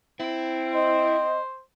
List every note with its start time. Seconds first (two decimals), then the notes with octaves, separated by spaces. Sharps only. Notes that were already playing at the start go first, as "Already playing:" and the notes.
0.20 C4 E4
0.74 C5 D#5